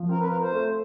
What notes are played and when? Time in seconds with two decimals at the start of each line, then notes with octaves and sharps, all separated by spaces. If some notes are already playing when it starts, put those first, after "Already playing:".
Already playing: F3
0.09 C4 A#4
0.19 B4
0.28 F4 A#4
0.41 C5
0.52 A3